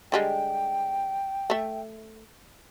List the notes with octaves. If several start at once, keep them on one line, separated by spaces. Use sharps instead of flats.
D3 G3 G#3 G5
A3 E5